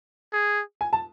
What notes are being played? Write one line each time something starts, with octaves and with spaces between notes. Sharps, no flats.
G#4
G#5
A5